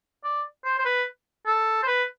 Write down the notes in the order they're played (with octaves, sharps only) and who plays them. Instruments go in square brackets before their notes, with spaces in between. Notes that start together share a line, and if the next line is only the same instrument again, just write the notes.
[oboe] D5
C5
C5
B4
A4
C5
B4